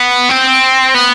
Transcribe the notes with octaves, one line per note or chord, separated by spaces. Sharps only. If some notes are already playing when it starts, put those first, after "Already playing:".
Already playing: B3
C4
B3